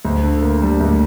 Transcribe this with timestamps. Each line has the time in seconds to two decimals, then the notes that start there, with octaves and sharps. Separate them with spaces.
0.05 D2
0.24 D3
0.42 A#3
0.62 G3
0.81 D2